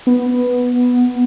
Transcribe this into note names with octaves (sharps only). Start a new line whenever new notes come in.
B3